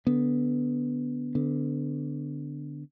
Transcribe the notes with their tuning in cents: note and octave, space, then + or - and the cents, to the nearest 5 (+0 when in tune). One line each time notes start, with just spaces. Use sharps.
D3 -15 B3 +0
D3 -5 B3 +25